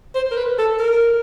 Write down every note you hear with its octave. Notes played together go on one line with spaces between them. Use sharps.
C5
A#4
B4
A4
A#4